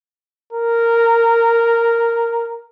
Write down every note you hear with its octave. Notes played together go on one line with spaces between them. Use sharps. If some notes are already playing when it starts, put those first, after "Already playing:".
A#4